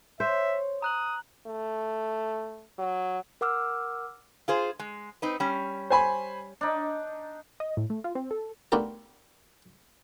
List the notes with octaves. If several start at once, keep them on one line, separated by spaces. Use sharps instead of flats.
C5 C#5 E5
A#5 D#6 F#6 F#7
A3
F#3
A#4 F#5 D6 E6 F6
F4 G#4 C5
G#3
C4 D#4 B4
G3 C#4
C5 G#5 B5
D4 D#4
D#5
A2
A3
F4
C4
A4
A3 B3 D4 F4 G4 A#4